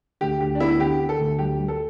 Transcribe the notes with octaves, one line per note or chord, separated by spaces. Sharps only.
D2 G4
D2 G4
D4
B3 E4
D3 G4
D3
A4
D2
G3 G4
G3
A4